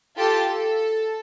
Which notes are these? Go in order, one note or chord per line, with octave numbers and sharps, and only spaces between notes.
F4 G4 A4 A5 D6 A6
A4